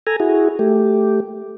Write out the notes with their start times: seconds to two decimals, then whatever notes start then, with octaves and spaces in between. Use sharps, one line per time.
0.07 A4 G#5 A#5
0.20 E4 F#4 G#4
0.59 A3 G4